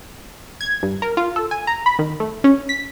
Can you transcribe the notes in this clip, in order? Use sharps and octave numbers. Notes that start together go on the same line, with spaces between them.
G#6
G2
A#4
F4
A4
G#5
A#5
B5
D#3
A3
C#4
B6